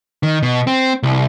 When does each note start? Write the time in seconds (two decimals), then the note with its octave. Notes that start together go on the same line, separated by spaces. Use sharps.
0.23 D#3
0.43 B2
0.67 C4
1.03 C2